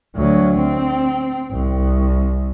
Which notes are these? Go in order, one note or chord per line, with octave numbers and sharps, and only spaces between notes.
D2 F#3
C4
C2